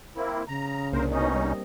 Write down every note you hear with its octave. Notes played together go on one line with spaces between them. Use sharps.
A#3 C4 E4 A#4
C#3 A#5
C2 A#3 D4 A#4 C5
B2 C4 C#4 D#4 D#5
G3